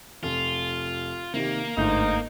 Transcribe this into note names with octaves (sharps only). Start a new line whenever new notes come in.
F1 F4
C3 D#3 A#3 G4
G1 D2 G#2 A3 D#4 G6